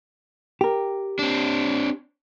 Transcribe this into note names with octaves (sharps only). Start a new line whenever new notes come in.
G4 A#4
C4 D4